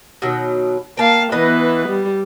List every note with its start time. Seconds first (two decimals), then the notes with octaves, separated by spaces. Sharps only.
0.22 B2 D#3 F#3
0.97 A#3 F5 G5 A5
1.32 E3 B3 B4 D#5
1.89 G3